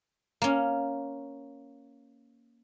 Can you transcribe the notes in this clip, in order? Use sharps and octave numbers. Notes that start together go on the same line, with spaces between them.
A#3 C#4